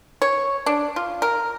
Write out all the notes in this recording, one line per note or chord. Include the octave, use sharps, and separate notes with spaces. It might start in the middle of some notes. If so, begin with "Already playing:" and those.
C#5
D4
F4
A#4